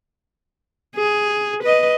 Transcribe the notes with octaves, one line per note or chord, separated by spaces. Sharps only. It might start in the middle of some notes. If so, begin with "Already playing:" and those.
G#4
B4 D#5